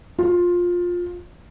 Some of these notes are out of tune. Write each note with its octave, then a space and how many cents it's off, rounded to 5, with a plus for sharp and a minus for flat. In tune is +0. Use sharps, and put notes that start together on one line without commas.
F4 +15